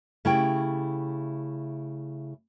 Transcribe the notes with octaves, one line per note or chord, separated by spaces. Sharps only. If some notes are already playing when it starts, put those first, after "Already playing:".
C#3 A3 E4 G4 C#5 G5